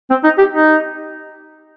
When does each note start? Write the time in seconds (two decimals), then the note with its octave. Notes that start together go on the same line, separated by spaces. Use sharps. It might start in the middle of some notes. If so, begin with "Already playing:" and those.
0.10 C4
0.24 D#4
0.38 G4
0.52 D#4